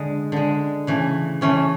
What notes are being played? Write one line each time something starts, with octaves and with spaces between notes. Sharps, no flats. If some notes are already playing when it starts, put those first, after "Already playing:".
Already playing: D3 G#3
D3 G#3
C#3 E3 A3
C#3 E3 A3 C#4